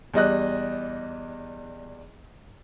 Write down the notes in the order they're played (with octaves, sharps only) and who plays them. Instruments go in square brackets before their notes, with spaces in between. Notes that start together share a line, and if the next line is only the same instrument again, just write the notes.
[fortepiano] E2 G3 D#5 F#6